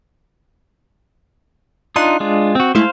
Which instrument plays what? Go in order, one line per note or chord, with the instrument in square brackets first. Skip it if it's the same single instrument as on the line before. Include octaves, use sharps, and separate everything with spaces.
[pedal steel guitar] D4 D#4 F4 [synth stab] C6 F#6
[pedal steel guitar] G#3 D4 F4
C4 F#4
[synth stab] G#3 A3 E4 [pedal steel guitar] C5 F5